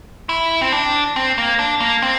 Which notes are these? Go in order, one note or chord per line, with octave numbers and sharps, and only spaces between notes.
E4
C4
D4
C4
A#3
D4
A#3
C4